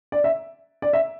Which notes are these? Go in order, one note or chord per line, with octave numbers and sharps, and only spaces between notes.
D5
E5
D5
E5